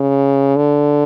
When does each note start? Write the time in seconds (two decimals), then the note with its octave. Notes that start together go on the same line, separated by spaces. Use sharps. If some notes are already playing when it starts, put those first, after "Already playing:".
Already playing: C#3
0.56 D3